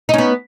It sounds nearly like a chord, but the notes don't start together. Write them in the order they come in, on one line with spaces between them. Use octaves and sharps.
D#4 C#4 B3